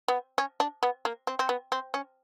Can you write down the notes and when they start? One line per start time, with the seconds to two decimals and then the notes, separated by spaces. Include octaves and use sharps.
0.08 B3
0.38 C#4
0.60 D4
0.83 B3
1.05 A#3
1.27 C4
1.39 C4
1.49 B3
1.72 C4
1.94 C#4